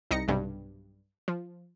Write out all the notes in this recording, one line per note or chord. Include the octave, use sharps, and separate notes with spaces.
C2 D#4 A#6 C#7
B1 G2 C3
F3